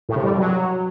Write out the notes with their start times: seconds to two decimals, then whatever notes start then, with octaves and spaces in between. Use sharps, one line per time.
0.09 A2
0.16 C3
0.23 G3
0.31 G2
0.38 F#3